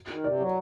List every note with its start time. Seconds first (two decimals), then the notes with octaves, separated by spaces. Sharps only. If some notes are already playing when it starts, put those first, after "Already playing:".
0.09 D#3
0.24 C3 D5
0.40 F#3